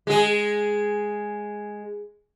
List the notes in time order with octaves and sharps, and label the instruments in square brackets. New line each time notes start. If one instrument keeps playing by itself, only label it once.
[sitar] G#3 G#4